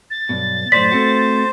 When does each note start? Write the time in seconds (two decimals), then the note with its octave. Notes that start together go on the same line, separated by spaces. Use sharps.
0.11 A6
0.29 B1 G2 B2
0.72 F#2 A2 C5 D5 B6
0.92 A3 C4 F#4